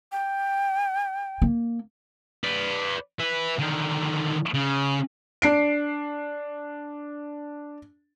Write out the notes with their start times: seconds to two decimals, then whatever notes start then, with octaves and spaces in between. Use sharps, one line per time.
0.12 G5
1.42 A#3
2.44 B4 D5
3.20 E4 B4
3.59 D3 D#3
4.54 C#3
5.42 D4 C7 D7